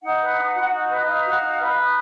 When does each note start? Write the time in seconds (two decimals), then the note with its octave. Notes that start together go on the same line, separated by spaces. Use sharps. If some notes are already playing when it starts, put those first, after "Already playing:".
0.02 D#4 F#5
0.20 B4
0.37 D#4
0.54 F#4
0.71 D#4
0.89 B4
0.98 D#5
1.07 D#4 F5
1.24 F#4
1.42 D#4
1.59 B4
1.77 D#4